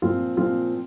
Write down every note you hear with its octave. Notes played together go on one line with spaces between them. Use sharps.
A#2 F3 C4 F4
A#2 F3 C4 F4